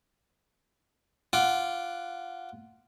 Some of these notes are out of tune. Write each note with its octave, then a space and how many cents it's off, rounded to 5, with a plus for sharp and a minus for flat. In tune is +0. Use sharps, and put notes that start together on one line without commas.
F4 -10 F#5 +0 D6 +0